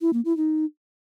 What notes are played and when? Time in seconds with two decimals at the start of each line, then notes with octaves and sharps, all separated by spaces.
0.01 E4
0.13 A#3
0.25 E4
0.37 D#4